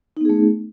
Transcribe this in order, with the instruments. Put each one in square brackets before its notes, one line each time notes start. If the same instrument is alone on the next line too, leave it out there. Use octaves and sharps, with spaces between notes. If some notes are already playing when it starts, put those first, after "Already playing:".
[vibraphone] D#4
B3
G#4
A3